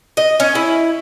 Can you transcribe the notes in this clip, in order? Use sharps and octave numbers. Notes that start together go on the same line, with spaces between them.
D#5
C#4
E4